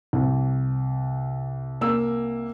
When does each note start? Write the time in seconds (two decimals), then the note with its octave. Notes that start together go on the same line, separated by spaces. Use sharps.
0.13 C2
1.81 A#3 E6